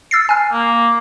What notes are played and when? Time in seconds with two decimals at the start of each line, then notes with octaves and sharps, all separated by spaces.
0.11 E6 A6 C7
0.29 G#5 F6
0.53 A#3